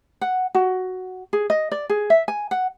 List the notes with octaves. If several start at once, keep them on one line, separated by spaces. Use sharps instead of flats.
F#5
F#4
G#4
D#5
D5
G#4
E5
G#5
F#5